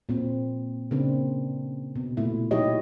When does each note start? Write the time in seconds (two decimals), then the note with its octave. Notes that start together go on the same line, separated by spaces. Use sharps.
0.09 A#2 C4
0.91 C#3 A#3 C4 D4
1.95 B2
2.17 A#2 A3 E4
2.51 F#3 D#4 E4 G4 C#5 D#5